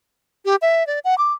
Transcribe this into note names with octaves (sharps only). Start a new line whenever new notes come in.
G4
E5
D5
F#5
D6